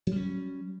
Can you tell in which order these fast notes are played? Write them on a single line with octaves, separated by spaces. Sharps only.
F#3 G3 C#4